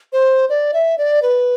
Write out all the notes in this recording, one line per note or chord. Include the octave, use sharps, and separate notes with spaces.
C5
D5
E5
D5
B4